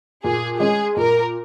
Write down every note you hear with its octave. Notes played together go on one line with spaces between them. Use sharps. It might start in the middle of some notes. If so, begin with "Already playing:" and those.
A#2 G#4
G#3 C#4 G#4
A#2 A#4